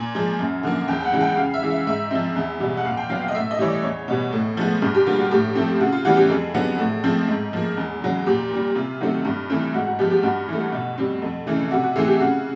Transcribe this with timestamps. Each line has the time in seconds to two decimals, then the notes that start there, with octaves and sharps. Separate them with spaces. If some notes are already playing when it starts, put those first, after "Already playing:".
Already playing: A#2 G#5
0.15 F3 G#3
0.39 F#2
0.63 D3 F3 A#3
0.88 E2 G5
1.01 G5
1.05 F#5
1.13 C#3 E3 G#3
1.21 G5
1.37 C#3 F5
1.54 E5
1.62 E3 G#3
1.70 E5
1.87 G#2 E5
2.11 F3 G#3 C4
2.36 E2
2.60 B2 G3
2.77 F#5
2.85 A#2 F5
2.97 G5
3.10 F#3 B3 F5
3.22 F5
3.28 D#5
3.34 A2 E5
3.51 D#5
3.59 E3 G3 C#5
3.67 D5
3.83 E2 C#5
4.08 B2 G3 B3
4.33 A2
4.57 F3 G#3 B3
4.82 G2 G#4
4.95 G4
5.06 D3 G3 A#3 F4
5.19 F#4
5.31 A2 G4
5.55 F3 A3 C4
5.81 C#3 F#4
5.93 F4
6.05 E3 G3 B3 F#4
6.17 G4
6.29 F2 G#4
6.54 D3 F#3 B3
6.79 A2
7.03 F3 G#3 C4
7.28 G#2
7.53 F3 A#3
7.77 E2
8.02 C#3 F#3
8.26 A#2 G4
8.51 G3 A#3
8.75 C3 F4
9.01 D#3 F#3 A3 C4
9.25 G2
9.50 E3 A3 C4
9.74 G#2 F#4
9.87 F#4
9.99 F3 G#3 B3 G4
10.11 G4
10.23 G2 F#4
10.48 E3 A3
10.72 B2
10.98 G3 C4
11.22 F2
11.47 C#3 E3 A3
11.71 C3 F#4
11.84 F#4
11.96 E3 A3 C4 G#4
12.08 G4
12.20 C#3 F#4